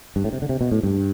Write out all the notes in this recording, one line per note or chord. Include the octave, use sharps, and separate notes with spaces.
G2
A2
C3
D3
C3
B2
A2
G2